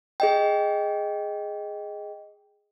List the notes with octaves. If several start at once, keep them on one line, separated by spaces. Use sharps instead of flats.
G#4 D#5 G5